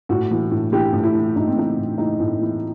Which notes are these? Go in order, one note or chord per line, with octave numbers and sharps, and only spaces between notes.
A2 F#4
E3
A2
E3 G4
A2
E4
E3
A2 D#4
C4
E3 D#4
A2
E3 D#4
A2
E3